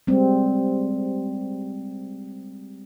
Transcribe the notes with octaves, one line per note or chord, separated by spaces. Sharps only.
G3 G#3 C4